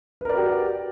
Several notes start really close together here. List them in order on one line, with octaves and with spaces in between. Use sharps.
B4 A#4 D5 F#4 G4